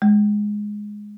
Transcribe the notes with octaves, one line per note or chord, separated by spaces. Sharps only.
G#3